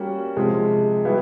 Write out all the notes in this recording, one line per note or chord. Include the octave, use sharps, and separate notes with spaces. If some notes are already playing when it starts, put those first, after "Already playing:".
Already playing: G3 A#3 C#4 F#4
C3 F3 G#3
B2 G3 B3 E4